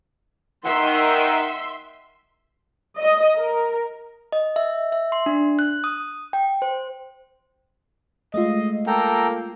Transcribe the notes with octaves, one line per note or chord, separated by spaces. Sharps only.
D#3 E5 F#5 C6
D#5
A#4
D#5
E5
E5
C6
D4
F#6
D#6
G5
C5
G#3 A3 F4 D#5
A#3 A4 G5 A#5